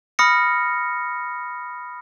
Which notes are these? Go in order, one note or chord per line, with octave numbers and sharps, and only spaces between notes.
B5 D#6 F6 A#6 C#7